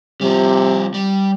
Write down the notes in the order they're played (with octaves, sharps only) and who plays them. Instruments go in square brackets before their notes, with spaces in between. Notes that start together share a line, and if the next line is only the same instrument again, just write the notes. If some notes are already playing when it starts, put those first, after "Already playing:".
[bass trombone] C3 [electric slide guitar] F3 G3
[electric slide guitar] G3